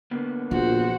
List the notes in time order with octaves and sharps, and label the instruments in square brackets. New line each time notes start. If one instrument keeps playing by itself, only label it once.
[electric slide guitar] D3 A#3 B3
[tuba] A#1 [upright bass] F3 [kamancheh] F#4 C5